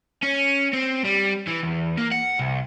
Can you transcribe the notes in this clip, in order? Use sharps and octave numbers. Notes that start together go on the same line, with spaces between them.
C#4
C4
G3
E3
E2
A#3
F#5
C2